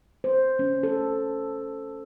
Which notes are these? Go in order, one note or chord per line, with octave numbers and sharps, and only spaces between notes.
C5
C#4
A4